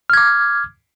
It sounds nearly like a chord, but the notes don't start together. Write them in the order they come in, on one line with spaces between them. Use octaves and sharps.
F6 G#6 D6